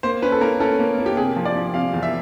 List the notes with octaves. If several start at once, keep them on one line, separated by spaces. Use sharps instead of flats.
A#3 C5
C#4 B4
A4
A#3 A#4
C#4 A4
A#3
A#3
G4
C3 G#4
F3
D5
F3
C3 F5
E2
E5